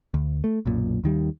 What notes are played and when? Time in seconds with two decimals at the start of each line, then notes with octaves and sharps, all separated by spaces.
0.14 D2
0.44 A3
0.66 B1 F#2 A#2
1.04 D#2 D#3 G3